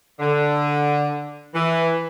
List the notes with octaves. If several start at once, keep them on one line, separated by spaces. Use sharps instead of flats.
D3
E3